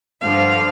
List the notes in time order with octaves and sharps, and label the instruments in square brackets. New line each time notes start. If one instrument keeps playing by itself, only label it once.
[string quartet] G2 D3 F3 F5